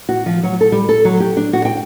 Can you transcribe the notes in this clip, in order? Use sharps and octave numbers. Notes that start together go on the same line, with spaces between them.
F#4
F3
F#3
A4
G3
A4
F#3
G4
D4
F#4
G5